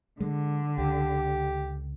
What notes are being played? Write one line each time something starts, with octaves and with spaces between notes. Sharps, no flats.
D3 G#3
C#2 G4